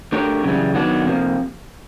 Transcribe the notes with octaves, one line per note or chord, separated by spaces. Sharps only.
A3 D4 G4 A#4 C#5
F#2 C#3 E3 G3
D#3 F#3 B3 D4
F2 C3 F3 A#3